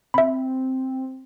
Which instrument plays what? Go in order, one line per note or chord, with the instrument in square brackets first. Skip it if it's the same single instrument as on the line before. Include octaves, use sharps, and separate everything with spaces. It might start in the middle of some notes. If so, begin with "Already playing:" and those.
[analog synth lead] C4 [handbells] E5 B5